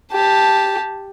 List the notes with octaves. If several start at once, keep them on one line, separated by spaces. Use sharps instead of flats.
G4 A5